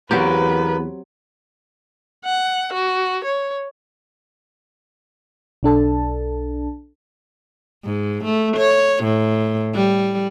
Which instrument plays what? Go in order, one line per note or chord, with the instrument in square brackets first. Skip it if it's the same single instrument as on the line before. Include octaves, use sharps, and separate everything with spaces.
[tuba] E2 [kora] F#3 C4 G4 [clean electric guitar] B3 A#4 [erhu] B4
[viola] F#5
F#4
C#5
[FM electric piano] B1 D4 A4 A5
[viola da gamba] G#2
A3
C#5
A2
G3